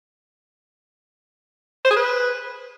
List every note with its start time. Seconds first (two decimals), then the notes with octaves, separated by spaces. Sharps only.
1.85 C5
1.90 G#4
1.96 B4